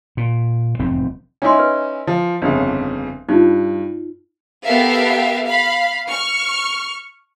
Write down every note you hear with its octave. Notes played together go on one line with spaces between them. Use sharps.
A#2
F1 E2 G#2 C4
C#4 D#4 E4 G#5 C6
B4
F3
G1 F2 C#3
G2 D#4 F4
B3 G4 A4 A#4 E5 F5
F5 B5
C#6 F6